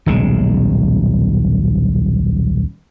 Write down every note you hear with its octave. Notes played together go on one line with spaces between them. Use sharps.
D#1 B1 C#3 G#3